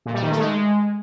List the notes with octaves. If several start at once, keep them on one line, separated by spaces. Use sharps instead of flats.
A#2
G3
D#3
A3
G#3